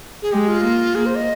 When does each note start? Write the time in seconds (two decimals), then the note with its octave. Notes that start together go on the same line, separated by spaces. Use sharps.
0.22 G#4
0.32 G#3 G4
0.48 F4
0.64 A#3
0.95 A#3 G#4
1.06 C5
1.17 D#5